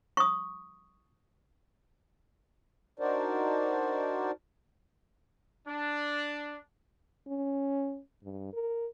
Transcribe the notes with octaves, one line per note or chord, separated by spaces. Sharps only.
C#6 D#6
D4 D#4 F#4 A#4 C5 D5
D4
C#4
G2
A#4